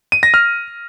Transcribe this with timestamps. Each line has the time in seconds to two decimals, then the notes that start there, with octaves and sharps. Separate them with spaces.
0.12 D#7
0.23 A#6
0.34 F6